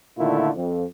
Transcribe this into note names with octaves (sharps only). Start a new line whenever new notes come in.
A#2 D3 D#3 A3 E4 F4
F2